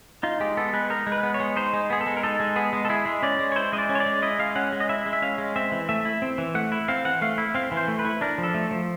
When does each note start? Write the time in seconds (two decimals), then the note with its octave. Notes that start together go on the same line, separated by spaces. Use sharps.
0.23 D#4 F4
0.40 G#3 G4
0.57 B3 A4
0.73 G#3 B4
0.90 D#4 A#4
1.07 G#3
1.12 B4
1.23 B3
1.34 C#5
1.40 G#3
1.56 D#4 C5
1.73 G#3
1.90 B3 G#4
2.01 A4
2.07 G#3
2.17 A#4
2.23 D#4 A4
2.40 G#3
2.56 B3 G#4
2.73 G#3
2.85 A4
2.89 E4 G#4
3.06 G#3
3.22 C#4 D5
3.39 G#3
3.52 C#5
3.56 E4 C5
3.73 G#3 D#5
3.78 D5
3.89 C#4
3.95 C#5
4.00 D5
4.06 G#3
4.22 E4 D#5
4.39 G#3 F5
4.56 C#4 F#5
4.72 G#3
4.80 D#5
4.89 E4 E5
5.06 G#3
5.13 E5
5.22 C#4 F5
5.38 G#3
5.56 C4 E5
5.72 E3
5.89 A3 E5
6.05 E4
6.22 C4
6.38 E3
6.55 A3 F#5
6.72 E4
6.88 C4 F5
7.05 E3 F#5
7.22 A3 F5
7.38 E4
7.55 C4 F5
7.72 E3
7.77 C5
7.88 A3
7.99 B4
8.05 E4
8.21 D4 A#4
8.38 F3
8.43 A4
8.54 A3
8.71 F3